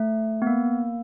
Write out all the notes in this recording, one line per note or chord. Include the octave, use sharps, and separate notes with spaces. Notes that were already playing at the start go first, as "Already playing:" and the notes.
Already playing: A3
B3
A#3